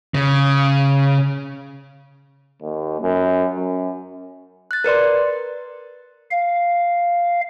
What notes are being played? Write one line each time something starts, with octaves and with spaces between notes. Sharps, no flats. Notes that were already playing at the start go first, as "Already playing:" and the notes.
C#3
D#2
F#2
F#2
F#6 A6
A#4 B4 D5 C6
F5